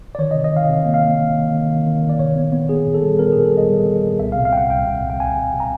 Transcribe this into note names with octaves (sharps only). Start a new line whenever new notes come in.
D5
D#3 C#5
D#5
C3
D#5
D#3 F5
C3
A#3
F5
A#3
D#3
D#3
D#3
D#3
D#3
D#3
D5
A#2 C#5
B3
B3
B3 G#4
A#2
A4
G3
B3 A#4
A#2 G#4
A4
G3 D#5
G3
G3
A#2
C2 E5
C3 F5
F5
C2 F#5 G5
C2 G5
C3
C2
G5
C2 G#5
C3
C3
A#5